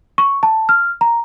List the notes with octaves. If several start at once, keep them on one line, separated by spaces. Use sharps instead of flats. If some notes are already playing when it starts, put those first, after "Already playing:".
C#6
A5
F6
A#5